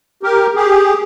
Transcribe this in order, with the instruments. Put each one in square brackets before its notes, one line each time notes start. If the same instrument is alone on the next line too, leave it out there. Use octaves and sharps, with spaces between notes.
[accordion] G4 A#4
G4 G#4